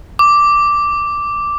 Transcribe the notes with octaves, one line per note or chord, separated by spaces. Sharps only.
D6